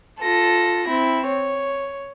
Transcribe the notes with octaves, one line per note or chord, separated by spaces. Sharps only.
F4 A4 A#6
C4 E4
C#5